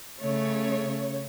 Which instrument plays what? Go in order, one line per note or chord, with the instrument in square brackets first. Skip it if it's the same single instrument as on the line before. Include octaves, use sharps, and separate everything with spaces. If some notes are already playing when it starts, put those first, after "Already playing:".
[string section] C#3 C#5 [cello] A3